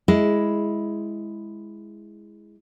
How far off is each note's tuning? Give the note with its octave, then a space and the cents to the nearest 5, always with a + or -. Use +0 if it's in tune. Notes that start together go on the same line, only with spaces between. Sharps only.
G#3 +0 E4 +0